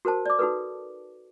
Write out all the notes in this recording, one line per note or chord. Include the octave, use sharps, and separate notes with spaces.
F#4 A#4 C5 A5
D5 D6
D#4 F#4 A4 B4